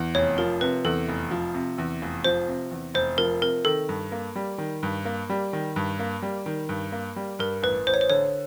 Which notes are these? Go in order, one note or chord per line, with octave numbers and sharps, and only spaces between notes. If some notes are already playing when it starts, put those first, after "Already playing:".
Already playing: E2
F1 C#5
F3 A#4
C3 B4
E2 A4
F1
F3
C3
E2
F1
F3 C5
C3
E2
F1 C5
F3 A#4
C3 A#4
D#3 A4
G2
A#3
G3
D#3
G2
A#3
G3
D#3
G2
A#3
G3
D#3
G2
A#3
G3
G2 A#4
A1 B4
A1 C5
C#5
C5
D3 C#5